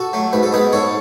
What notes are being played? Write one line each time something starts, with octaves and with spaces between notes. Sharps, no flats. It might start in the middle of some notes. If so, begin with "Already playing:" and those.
Already playing: F#4 A4
F#3 A3
G#2 B4
A4
G#3 B3 G#4 B4
G#2 A4 C#5